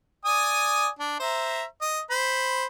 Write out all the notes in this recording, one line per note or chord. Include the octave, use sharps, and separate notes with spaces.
D5 G#5 D#6
D4
C5 E5 A#5
D#5
C5 B5